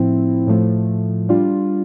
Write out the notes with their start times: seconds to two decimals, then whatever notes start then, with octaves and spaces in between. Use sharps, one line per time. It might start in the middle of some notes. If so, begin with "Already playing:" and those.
Already playing: A2 F3 C4 E4
0.47 A2 F3 A3
1.29 G3 D4 F4